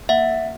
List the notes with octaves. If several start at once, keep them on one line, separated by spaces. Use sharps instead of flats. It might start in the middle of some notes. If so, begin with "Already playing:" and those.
A#3 E5 F#5